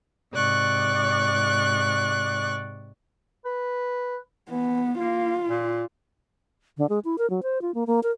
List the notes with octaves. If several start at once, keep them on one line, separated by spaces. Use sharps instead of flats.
G#2 C3 D5 C#6 F#6
B4
E3 B3
A#3 F4
A#2
D3
G#3
E4
A#4
F#3
C5
F4
A#3
A#3
A#4